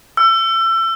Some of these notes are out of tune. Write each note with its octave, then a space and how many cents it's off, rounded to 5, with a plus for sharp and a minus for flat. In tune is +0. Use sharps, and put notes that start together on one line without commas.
E6 +30